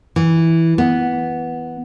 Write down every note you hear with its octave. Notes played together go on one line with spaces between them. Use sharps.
E3
B3